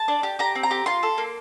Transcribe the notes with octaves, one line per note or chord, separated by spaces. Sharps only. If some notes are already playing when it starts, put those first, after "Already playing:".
Already playing: A5
D4
G4
G4 A#5
C4
A#5
G4
F4 C6
A4
A#3